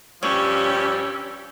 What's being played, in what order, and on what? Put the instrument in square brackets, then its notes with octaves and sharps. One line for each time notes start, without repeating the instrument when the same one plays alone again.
[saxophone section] G2 F3 G3 [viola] C#4 G4 [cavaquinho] C#5 [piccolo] E6